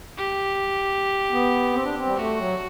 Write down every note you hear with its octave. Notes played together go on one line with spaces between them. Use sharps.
G4
B3
C4
D4
C4
G3
A3 F#4
F#3